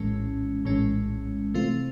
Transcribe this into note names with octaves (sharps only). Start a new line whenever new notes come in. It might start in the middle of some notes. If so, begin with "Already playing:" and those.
Already playing: A#1 A2 E3 G#3 C#4
A#1 A2 E3 G#3 C#4
C3 E3 A3 C4 F4